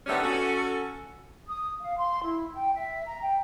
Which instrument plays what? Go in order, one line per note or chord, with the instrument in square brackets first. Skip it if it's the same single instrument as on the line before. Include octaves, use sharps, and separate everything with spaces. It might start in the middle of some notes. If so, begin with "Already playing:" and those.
[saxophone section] D3 D#3 G3 A3 B3 C#4
C#4 F#4 A4
[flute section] D#6
F5
C6
E4
G5
E5
A#5
G5